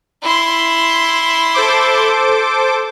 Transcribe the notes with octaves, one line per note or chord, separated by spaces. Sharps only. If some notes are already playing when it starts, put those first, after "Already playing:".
E4 C6
A4 C5 D6